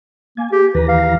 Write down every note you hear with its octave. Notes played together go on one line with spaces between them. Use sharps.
A#3 G#5
G4 G#4
D#2 E3 B4 A#5
F5